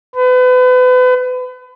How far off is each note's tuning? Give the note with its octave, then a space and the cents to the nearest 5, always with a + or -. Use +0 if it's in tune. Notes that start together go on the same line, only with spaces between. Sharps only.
B4 +35